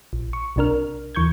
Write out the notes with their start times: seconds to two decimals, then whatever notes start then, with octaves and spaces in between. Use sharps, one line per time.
0.13 A#1
0.33 C#6
0.56 B1 C3 D4 A#4 F6
1.15 D#2 E3 C#6 G6 G#6